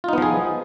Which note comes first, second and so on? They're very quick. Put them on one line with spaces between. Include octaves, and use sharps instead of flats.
F4 D#4 B3 F3 G#4